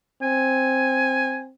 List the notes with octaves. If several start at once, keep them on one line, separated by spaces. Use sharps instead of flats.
C4 G#5